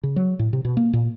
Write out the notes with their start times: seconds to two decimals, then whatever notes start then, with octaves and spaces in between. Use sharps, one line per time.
0.03 C#3
0.16 F#3
0.39 A2
0.53 C3
0.65 B2
0.77 A#3
0.93 A#2